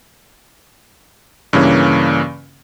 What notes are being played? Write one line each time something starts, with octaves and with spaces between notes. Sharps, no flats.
G2 C#3 E3 A#3 C#4